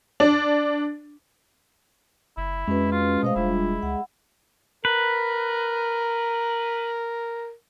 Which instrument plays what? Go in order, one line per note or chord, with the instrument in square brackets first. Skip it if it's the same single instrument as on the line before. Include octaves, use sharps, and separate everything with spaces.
[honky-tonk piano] D4
[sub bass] F#1 [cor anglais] E4
[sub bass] F2 [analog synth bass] G#3 [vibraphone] C#4 F#4 B4
[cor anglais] F4
[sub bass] B2 [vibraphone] A3 C5 F5 [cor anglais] D#5
[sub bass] E1 [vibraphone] G3 D4 F4 [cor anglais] E4
[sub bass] C#2 [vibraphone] F#5
[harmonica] A#4 [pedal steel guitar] B4